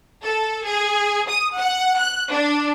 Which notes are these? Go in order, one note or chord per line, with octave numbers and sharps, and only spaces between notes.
A4
G#4
D#6
F#5
F#6
D4